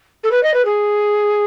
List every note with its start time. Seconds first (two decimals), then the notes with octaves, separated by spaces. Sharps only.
0.24 A4
0.31 B4
0.43 D#5
0.54 B4
0.65 G#4